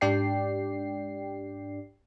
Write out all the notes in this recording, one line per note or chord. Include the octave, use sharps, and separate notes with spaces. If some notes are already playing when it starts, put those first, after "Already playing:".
G#2 D4 G4 D5 G5 C7